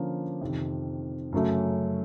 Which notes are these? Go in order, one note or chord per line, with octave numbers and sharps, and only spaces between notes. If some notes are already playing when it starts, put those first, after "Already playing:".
Already playing: D3 F3 A#3 C#4
F2 C3 D#3
F#2 C#3 F#3 A3